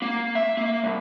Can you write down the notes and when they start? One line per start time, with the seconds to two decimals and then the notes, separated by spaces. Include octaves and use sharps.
0.02 A#3
0.35 E5
0.57 A#3
0.84 C2